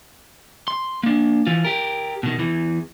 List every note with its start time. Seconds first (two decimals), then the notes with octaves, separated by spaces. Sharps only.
0.68 C6
1.03 A#3 D4
1.47 E3 F4
1.65 G4 A#4
2.23 B2 D#3
2.39 E2 E3